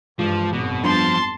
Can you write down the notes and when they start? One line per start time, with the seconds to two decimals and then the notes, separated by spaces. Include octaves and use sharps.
0.19 G2 E3 F3 G#3 D6
0.53 G#1 F#2 B2
0.84 F3 G3 B3 D4 A5 C6